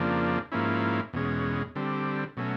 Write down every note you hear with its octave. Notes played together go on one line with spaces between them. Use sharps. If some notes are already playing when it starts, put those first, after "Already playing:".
Already playing: F2 C#3 F3 A#3 D4
G#2 F3 A#3 C#4 E4
E2 B2 G#3 C#4
D3 G3 C4
B2 F#3 A3 C#4